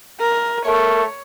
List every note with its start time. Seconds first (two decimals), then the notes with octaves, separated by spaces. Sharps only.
0.20 A#4
0.65 A3 A#4 C#5